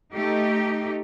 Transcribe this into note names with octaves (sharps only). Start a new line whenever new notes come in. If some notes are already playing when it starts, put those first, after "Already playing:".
A3 D#4 G4